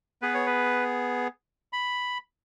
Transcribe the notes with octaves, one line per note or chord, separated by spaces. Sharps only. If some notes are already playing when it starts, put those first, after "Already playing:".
B3 G#4 B4
C#5
B4
B5